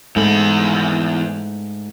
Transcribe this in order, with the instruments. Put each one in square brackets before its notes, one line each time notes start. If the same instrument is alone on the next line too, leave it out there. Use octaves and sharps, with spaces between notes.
[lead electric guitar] E2 B5 [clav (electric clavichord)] G#2 A3